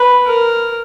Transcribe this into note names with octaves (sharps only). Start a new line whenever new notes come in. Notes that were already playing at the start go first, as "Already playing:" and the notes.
Already playing: B4
A#4